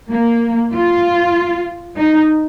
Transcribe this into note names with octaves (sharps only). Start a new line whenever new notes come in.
A#3
F4
D#4